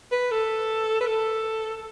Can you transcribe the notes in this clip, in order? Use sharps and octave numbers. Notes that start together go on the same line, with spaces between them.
B4
A4
B4
A4